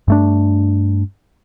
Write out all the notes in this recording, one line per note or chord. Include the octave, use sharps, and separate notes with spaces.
G2 A3 D4